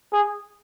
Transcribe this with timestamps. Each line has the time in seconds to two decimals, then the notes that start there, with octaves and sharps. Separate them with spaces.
0.13 G#4